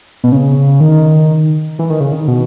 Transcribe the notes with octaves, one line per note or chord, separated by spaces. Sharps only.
B2
C#3
D#3
E3
D#3
C#3
D#3
B2